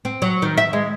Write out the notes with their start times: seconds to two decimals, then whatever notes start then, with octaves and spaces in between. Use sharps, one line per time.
0.05 C4
0.22 F#3
0.42 D#3
0.57 E5
0.73 G#3